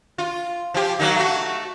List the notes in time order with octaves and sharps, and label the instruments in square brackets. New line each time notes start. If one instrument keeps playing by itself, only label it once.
[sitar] F4
F3 G4
F#3 A#3 D#4
A3 F#4